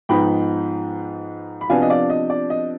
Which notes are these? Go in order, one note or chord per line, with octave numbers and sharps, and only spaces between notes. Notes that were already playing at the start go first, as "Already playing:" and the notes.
G#2 F3 B3 D#4 G5 B5
B5
C3 F3 B3 D4 F5 G#5
D#5
D5 F5
D#5
D5
D#5